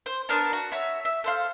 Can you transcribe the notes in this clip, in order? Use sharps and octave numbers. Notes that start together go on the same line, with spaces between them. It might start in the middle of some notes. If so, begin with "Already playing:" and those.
C5
B3 D4 A#4 A5
F#4
F#4 C#5 E5
E5
A4 C5 F5